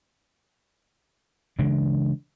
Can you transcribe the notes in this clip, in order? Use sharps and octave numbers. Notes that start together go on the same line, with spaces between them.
C#3 E3 G#3 D4